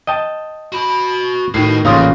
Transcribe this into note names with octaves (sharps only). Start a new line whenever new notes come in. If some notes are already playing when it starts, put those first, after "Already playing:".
D#5 G5 A5
F#4 B5
A2 D#3 F#4 B4 C7
A1 E2 A#2 C#3 F5 C6 D#6